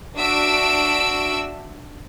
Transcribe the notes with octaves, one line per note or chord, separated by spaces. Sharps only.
D4 F#4 E5 E6 D7